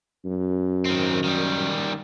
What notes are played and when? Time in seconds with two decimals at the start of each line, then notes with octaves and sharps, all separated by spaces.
0.25 F#2
0.85 D#3 C4
1.24 D#3 G3